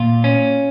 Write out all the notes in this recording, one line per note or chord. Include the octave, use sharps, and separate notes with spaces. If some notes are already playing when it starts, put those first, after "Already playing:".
Already playing: A#2 F4
C#4